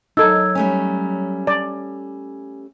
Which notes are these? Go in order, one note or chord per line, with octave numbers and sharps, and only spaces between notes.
F#3 D#4 A4 E6 G#6
G3 A3 C#4 G#5
D5